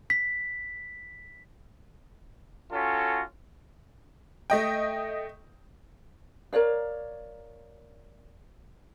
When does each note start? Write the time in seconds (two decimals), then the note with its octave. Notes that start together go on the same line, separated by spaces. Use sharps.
0.10 B6
2.73 C#4 F4 F#4 A4
4.50 A3 D#5 G5
6.53 A#4 C#5 D5 F5